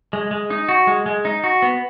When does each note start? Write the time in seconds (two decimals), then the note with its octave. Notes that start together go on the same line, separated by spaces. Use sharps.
0.13 G#3
0.31 G#3
0.50 D#4
0.69 F#4
0.87 G#3
1.06 G#3
1.25 D#4
1.44 F#4
1.62 B3